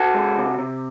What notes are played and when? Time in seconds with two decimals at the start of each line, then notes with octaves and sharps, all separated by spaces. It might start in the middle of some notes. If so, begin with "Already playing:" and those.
Already playing: F#4 A4
0.14 G#3
0.37 C3
0.59 C3